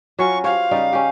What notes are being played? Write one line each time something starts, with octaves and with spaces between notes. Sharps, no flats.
F#3 C#4 F4 C#6
G4 C5 C#5 F5
C#3 G3 D#4
C#4 G4